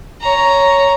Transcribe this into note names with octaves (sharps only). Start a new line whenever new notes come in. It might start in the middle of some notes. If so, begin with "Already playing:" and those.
C#5 A#5